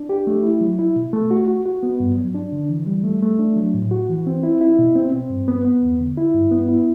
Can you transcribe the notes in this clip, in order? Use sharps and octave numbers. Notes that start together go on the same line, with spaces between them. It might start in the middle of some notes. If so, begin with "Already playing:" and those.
Already playing: D4
G4
A3
E4
F#3
E4
B2
A3
F#4
F#4
F#4
B3
G2
F#3
D4
D3
E3
G3
A3
A3
D4
F#3
A2
F#4
E3
C4
E4
E4
B2
C4
C4
G2
B3
B3
E2
D3
E4
G2
B3
E4